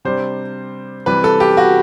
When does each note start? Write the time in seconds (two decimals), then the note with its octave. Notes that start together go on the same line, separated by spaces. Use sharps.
0.05 C3 G3 D4 C5
1.06 C3 E3 G3 B4
1.24 A4
1.40 G4
1.57 F#4